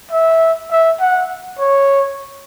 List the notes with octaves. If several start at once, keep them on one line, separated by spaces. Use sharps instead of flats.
E5
E5
F#5
C#5